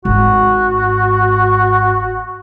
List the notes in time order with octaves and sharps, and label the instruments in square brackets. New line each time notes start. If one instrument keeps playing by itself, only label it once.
[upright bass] G#1 G#2 [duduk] F#4